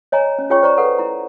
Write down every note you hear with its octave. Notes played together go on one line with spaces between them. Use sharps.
C#5 D#5 G#5 A#5
C#4
F4 G#4 A#4 C#5 G5 C#6
C5 D5 A#5 C#6
A4 B4 F#5 C#6
E4 A#5